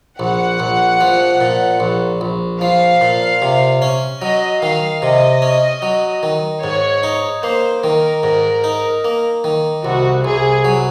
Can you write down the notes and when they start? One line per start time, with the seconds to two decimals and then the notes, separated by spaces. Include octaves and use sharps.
0.19 A#1 F#5
0.60 A#1
1.01 F3
1.41 A#2
1.80 A#1
2.21 A#1
2.61 F3 F5
3.01 A#2
3.42 C3
3.82 C#4
4.21 F#3 D#5
4.62 D#3 F5
5.02 C3 D#5
5.42 C#4
5.82 F#3
6.23 D#3
6.62 G#2 C#5
7.03 D#4
7.43 A#3 C5
7.83 D#3 A#4
8.23 G#2
8.64 D#4
9.05 A#3
9.44 D#3
9.85 C2 F#4
10.25 C2 G#4
10.65 F#3